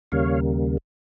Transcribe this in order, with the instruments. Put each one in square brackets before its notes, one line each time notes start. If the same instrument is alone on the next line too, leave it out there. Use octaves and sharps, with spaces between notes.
[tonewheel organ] D#2 C#3 G3 A#3 C#5 F5